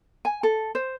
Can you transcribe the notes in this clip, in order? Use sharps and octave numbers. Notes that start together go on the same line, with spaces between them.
G#5
A4
C5